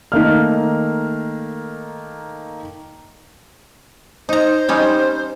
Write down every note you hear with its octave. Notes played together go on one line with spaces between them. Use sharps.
D#3 A3 A#3 F6
D#4 C5 A#5
G3 C#4 D#4